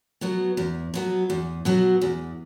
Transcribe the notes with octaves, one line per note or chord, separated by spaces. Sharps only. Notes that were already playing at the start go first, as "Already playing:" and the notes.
B2 F#3 B3
E2
B2 F#3 B3
E2
B2 F#3 B3
E2